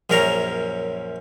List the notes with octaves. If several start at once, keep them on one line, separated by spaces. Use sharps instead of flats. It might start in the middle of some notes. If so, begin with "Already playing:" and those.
A#1 F#2 C#4 A#4 C#5 A#5